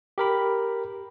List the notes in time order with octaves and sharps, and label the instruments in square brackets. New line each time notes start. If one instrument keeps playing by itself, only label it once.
[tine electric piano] G4 A#4 B5